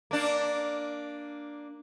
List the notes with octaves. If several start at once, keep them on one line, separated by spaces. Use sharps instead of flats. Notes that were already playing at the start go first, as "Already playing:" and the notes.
A#3 D4